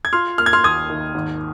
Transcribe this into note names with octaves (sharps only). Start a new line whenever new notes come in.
G#6
F4 C6 F6
A#3 F6
G#6
C6 F6
D#2 D#6 G#6
D#3
G#1